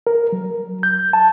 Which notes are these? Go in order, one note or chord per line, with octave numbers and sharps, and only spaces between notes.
A#4
F#3
G6
A5